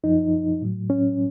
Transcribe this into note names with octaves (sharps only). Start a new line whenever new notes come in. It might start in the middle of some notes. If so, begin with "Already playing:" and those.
F#2 F3 D#4
A2 F#3
C#4